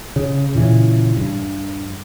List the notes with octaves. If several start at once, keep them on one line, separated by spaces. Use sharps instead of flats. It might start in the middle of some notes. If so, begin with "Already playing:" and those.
C#3
A#2 C#3 E3
G2